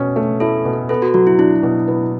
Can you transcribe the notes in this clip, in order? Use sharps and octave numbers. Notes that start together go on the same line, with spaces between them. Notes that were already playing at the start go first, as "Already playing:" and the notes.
Already playing: B2 C#4
A3
E4 A4
B2
B3 A4
F#4
F#3 F#4
E4
D4 E4
B2
B3